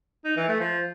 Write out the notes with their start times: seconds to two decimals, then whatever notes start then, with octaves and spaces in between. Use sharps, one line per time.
0.25 D#4
0.37 E3
0.48 A3
0.60 F3